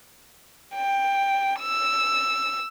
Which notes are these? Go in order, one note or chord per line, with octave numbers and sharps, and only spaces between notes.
G5
E6